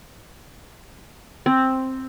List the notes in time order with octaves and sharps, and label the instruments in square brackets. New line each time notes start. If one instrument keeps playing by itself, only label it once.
[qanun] C4